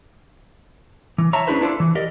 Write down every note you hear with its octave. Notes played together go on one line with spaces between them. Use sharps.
E3
C#5 E5 A5 A#5
C#4 D4 E4 G#4 B4 C5
D4 E4 F4 A4 C5 D5
E3
G4 A#4 D5 D#5